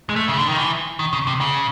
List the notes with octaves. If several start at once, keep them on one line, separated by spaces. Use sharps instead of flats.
G#3
A3
C#3
D3
D#3
E3
D#3
C#3
C3
C#3